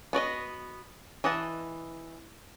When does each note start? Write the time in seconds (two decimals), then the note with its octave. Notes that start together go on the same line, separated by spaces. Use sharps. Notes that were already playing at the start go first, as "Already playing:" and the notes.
0.13 B3 F#4 D5 D#5
1.24 E3 D#5 F#5 A5